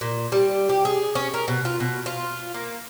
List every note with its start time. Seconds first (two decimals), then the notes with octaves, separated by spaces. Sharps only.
0.01 A#2
0.32 G3
0.69 G4
0.85 G#4
1.15 C#4
1.34 A#4
1.48 B2
1.65 F4
1.80 B2
2.06 F4
2.54 A#3